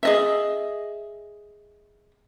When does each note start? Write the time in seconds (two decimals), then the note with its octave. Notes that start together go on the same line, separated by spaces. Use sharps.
0.03 G#4 D#5 E5